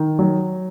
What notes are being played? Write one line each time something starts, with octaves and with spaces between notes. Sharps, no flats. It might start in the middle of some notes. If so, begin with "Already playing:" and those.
Already playing: D#3
F#3